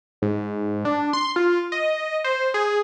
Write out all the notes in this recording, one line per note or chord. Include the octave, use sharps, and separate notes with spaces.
G#2
D4
C6
F4
D#5
C5
G#4